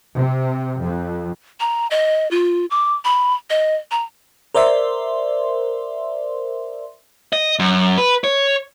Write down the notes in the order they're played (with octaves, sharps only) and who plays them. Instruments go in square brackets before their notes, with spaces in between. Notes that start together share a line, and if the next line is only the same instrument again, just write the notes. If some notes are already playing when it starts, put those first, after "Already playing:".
[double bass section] C3
F2
[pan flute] A#5
D#5
F4
D6
B5
D#5
A#5
[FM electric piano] A#4 C5 D5 E5 C6
[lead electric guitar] D#5
F#2
B4
C#5